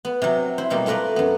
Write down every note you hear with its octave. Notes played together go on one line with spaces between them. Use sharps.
B3
C3 F#3
E4 C5
B2 F#3 G3 A#3
A3 F4 A#4 B4 D5
F#2 B3